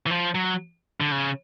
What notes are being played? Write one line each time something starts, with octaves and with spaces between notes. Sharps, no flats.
E3
F3
F#3
D3
C#3